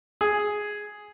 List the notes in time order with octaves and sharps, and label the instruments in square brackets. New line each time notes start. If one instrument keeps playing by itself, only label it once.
[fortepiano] G#4